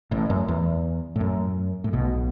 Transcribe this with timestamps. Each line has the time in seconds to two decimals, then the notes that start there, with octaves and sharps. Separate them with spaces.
0.11 A1 A2
0.30 F#2
0.48 E2
1.16 A2
1.21 F#2
1.84 A2
1.93 B1 B2